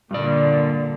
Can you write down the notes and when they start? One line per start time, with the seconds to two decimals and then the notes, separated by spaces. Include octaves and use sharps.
0.11 G2 A#2 D3 D5